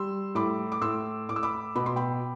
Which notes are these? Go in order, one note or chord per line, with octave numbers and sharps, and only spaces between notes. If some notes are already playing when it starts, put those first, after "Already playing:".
Already playing: G3 C6 E6
A2 B5 D6
D6
A2 C6 E6
A2 D6
E6
B5 D6
B2 B5
C6
G5 B5